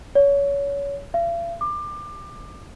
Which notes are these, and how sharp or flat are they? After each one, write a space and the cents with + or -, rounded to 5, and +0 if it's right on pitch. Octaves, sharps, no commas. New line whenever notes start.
C#5 +25
F5 -45
D6 +25